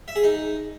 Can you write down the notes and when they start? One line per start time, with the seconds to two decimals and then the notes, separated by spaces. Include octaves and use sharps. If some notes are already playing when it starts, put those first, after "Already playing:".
0.08 E5
0.16 G#4
0.23 D#4